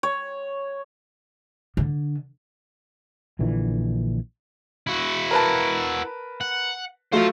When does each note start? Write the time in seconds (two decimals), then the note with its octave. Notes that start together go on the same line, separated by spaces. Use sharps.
0.03 C#5
1.77 D3
3.39 A#1 A#2 D3 E3
4.87 E4 F#4
5.31 A#4 B4 A5
6.41 F#5
7.12 F#3 A3 F4 C5 F5